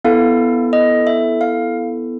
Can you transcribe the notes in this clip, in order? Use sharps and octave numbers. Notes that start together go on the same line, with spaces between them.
B3 E4 A4 F5
D#5
E5
F5